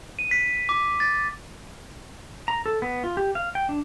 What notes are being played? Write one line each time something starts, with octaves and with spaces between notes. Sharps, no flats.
D#7
B6
D6
A6
A#5
A4
B3
F4
G4
F5
G5
D4